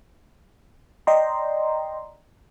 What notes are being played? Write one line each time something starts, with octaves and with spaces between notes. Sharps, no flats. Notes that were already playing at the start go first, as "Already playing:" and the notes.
D5 D#5 G5 A#5 C6